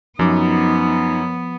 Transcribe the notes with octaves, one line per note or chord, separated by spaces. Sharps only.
F#2 F3 B3 D#4 D6